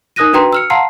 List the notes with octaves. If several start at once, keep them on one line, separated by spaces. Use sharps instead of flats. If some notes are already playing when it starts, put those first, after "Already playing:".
D#4 A#4 D#6 F#6 A#6 D#7
D4 F#4 B4 G5 A#5 C6
E6 F6 C#7
F5 F#5 A5 A#5 C6 C7